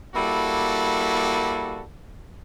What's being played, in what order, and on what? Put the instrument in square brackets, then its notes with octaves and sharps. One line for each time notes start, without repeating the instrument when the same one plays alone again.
[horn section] G3 A#3 E4 F#4 A4